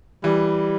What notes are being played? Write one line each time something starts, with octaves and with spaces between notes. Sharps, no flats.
E3 G3